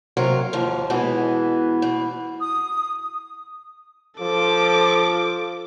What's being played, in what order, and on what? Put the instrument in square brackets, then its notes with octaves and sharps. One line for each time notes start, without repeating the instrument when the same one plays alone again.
[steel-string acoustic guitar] C3 D#3 F#3 A#4 F5
D#2 G#2 F3
B2 E3 G#3 B3
B2
[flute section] D#6
[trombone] F3 [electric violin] A4 D6